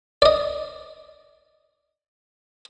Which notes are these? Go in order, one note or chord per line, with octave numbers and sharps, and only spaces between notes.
D5 D#5